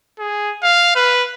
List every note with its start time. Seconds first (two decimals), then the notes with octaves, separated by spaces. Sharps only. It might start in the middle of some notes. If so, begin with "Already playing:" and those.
0.19 G#4
0.63 F5
0.96 B4